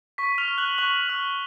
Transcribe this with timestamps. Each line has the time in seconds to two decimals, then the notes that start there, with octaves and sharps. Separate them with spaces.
0.18 C#6 B6
0.38 F6 F7
0.48 F6
0.58 F#6 F#7
0.78 C#6 F#6 F#7
1.09 F6